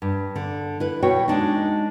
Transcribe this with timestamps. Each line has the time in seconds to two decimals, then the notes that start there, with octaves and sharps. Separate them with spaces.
0.02 G2
0.36 D3
0.80 E4 B4
1.02 B2 F#4 C#5 G5
1.28 G#3 D4 D#4